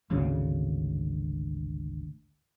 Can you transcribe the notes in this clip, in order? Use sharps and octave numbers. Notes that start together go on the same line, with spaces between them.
G#1 D2 C#3